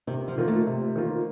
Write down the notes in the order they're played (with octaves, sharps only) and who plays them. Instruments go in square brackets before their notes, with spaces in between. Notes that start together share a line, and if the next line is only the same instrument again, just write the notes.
[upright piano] C3 [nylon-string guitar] D#3
[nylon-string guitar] F3
[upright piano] D#3 A#3 F4
[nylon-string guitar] A3
[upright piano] C3
D#3 A#3 F4